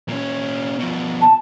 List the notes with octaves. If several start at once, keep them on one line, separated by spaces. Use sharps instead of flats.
A#2 C#4
B2 F3
A5